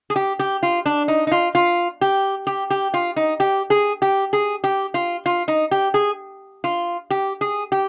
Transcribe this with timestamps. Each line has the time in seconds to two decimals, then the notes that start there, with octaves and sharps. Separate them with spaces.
0.10 G#4
0.16 G4
0.39 G4
0.63 F4
0.86 D4
1.08 D#4
1.27 D#4
1.32 F4
1.55 F4
2.01 G4
2.47 G4
2.70 G4
2.94 F4
3.16 D#4
3.40 G4
3.70 G#4
4.02 G4
4.33 G#4
4.64 G4
4.94 F4
5.26 F4
5.48 D#4
5.71 G4
5.94 G#4
6.64 F4
7.10 G4
7.41 G#4
7.72 G4